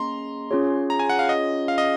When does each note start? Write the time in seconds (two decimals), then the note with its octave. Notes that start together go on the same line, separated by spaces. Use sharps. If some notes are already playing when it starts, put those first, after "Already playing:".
Already playing: A#3 C#4 G#4 D#5 A#5 C6
0.51 C#4 F4 G#4 C#5
0.90 A#5
0.99 G#5
1.09 F#5
1.19 F5
1.29 D#5
1.68 F5
1.78 D#5